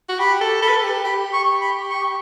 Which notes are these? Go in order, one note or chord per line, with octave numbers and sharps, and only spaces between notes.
F#4
G4 B5
A4
A4 B5
B4
A4
G4
G4 B5
C#6
B5
C#6